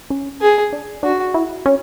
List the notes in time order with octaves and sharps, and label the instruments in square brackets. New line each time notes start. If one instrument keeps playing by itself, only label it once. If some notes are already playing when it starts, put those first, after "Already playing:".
[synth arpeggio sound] C#4
[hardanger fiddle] G#4
[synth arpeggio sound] D4
[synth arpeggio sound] D4 [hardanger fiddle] F#4
[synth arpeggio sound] E4
C#4